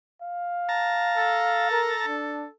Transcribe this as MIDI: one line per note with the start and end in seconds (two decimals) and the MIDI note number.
0.22 1.66 77
0.69 2.06 81
0.69 2.06 82
1.17 2.53 69
1.71 1.93 70
2.06 2.47 62